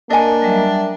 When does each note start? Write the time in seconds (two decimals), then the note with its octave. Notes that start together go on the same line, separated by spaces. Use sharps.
0.10 A#3 D4 D#5 G#5
0.42 F#3 G3 E5